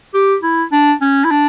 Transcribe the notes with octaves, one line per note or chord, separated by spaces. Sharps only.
G4
E4
D4
C#4
E4
D4